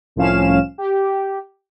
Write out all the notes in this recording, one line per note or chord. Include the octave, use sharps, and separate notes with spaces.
C2 A2 F3 C#4 F5 E7
G4